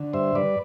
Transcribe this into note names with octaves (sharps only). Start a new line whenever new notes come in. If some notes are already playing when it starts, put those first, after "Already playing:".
Already playing: D3
G2 C5 E5
G2 B4 D5